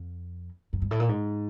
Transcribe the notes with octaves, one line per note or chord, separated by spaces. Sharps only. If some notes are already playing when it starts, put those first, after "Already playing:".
Already playing: F2
F#2
G2
A2
A#2
G#2